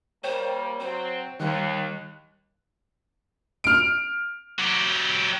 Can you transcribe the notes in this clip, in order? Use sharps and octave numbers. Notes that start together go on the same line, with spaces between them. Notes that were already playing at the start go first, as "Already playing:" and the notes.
G3 A#3 C5 C#5 G5
F#3 C4 C5
D#2 D#3 G3 F#6
F6 D7
F#3 G4